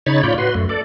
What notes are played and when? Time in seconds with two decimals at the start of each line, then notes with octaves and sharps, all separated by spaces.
0.06 C#3 D#4 C#5 B5 G#6 A6
0.23 A2 F4 C#5 D5 B5 G6
0.38 F#4 B4 C6
0.55 F#2 A3
0.69 A4 D5